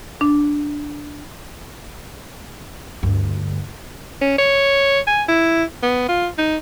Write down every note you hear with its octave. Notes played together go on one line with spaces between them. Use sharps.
D4
D2 G2
C#4
C#5
G#5
E4
B3
F4
D#4